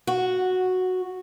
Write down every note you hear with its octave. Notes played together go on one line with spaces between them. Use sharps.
F#4